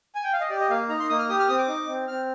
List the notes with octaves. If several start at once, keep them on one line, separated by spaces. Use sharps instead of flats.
G#5
G5
F5
D#5
G4 D5
D#5
A#3 F5
D#4 A#5
C6
A#3 D#6
F6
G4 D#6
F6
C4 D#6
D6
D#4
C4
C4 F6